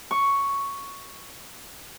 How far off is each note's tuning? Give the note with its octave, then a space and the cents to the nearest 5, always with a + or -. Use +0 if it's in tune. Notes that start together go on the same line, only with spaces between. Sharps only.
C#6 +5